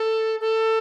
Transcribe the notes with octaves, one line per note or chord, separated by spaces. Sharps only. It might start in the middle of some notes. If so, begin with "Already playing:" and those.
Already playing: A4
A4